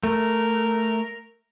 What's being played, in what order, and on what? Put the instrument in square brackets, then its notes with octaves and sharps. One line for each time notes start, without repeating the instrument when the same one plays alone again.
[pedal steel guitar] A3 [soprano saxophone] A#4